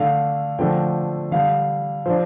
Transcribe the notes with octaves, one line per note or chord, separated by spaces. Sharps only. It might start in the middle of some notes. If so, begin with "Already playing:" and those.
Already playing: D3 A3 D4 F5
D3 F3 A3 D4 G5
D3 G3 D4 F5
F3 D4 C5